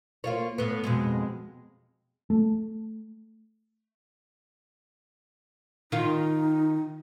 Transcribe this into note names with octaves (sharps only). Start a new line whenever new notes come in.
A#3 F4 C#5
A2 B3
F2 B2 G#3
A3
D#3 D#4 F4